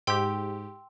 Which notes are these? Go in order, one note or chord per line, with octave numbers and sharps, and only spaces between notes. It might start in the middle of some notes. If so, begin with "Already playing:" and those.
G#2 G4 G5 C6 E6